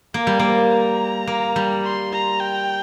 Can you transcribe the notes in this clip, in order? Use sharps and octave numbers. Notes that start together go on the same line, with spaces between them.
A#3 A#4
G3
A#3 C5
A#5
A#3
G3
C6
A#5
G5